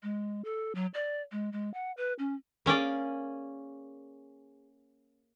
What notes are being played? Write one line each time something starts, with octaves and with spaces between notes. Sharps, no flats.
G#3
A4
F#3
D5
G#3
G#3
F#5
B4
C#4
A#3 C#4 G#4 D5